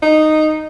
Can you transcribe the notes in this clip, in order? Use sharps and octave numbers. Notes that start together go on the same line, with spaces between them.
D#4